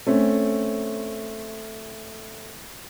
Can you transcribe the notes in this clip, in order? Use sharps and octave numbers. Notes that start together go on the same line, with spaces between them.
A3 C4 C#4